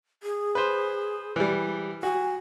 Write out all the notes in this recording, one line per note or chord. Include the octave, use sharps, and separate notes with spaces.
G#4
B4 C5
E3 G3
F#4 G#5